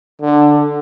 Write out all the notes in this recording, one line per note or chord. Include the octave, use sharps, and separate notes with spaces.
D3